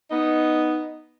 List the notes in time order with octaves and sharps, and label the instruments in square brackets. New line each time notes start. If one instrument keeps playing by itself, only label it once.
[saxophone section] B3 D#4